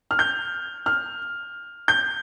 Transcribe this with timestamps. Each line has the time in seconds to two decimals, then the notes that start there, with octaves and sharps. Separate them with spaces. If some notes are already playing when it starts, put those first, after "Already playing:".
0.11 F6
0.19 G6
0.86 F6
1.88 G6